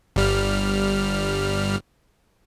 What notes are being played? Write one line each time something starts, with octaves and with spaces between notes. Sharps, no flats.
G1 G3 F6